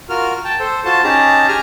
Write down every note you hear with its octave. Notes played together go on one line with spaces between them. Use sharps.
F4 F#4 A#4 F6
G5 A5
A4 C5
F4 F#4 C5 A5
C#4 D#4 G4 G#4 A5 A#5
G4 G#5 A#5 F6